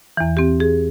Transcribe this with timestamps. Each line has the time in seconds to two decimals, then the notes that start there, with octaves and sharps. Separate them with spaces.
0.17 E2 E3
0.37 C4 G4
0.60 G#4